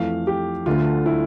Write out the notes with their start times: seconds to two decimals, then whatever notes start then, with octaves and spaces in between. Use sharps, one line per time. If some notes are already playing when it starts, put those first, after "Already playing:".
Already playing: F2 E3 A3 F5
0.27 G4
0.66 D2 D3 A3 F4
1.06 E4